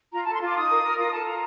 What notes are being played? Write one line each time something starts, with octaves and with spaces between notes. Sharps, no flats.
F4 A#5
A4 A5
C6
F4 D6
D#4 D#6
A#4
A#4 F6
F4 D#6
A4 A5
F4 A#5